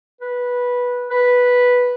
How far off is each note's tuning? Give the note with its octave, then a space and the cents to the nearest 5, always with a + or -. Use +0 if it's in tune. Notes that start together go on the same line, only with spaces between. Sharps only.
B4 -10
B4 -5